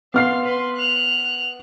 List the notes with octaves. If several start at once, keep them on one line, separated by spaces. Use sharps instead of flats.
B3 F5 C6 F6 C7
B4 C6
F#6 F7